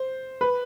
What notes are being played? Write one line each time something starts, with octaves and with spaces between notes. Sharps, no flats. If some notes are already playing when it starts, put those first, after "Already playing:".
Already playing: C5
B4